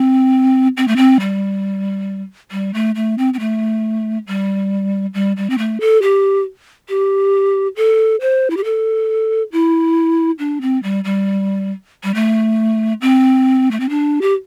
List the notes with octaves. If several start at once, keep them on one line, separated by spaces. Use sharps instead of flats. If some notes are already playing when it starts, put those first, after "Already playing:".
Already playing: C4
C4
A3
C4
G3
G3
A3
A3
C4
C4
A3
G3
G3
G3
C4
A3
A4
G4
G4
A4
C5
E4
G4
A4
E4
D4
C4
G3
G3
G3
A3
C4
A3
C4
D4
G4